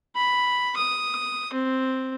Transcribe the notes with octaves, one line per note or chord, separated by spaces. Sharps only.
B5
D#6
C4